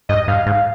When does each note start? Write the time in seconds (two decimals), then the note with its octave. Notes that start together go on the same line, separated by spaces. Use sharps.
0.09 G2 D#5
0.28 G2 F5
0.46 G#2